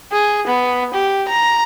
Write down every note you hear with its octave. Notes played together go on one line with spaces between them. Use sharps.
G#4
B3
G4
A#5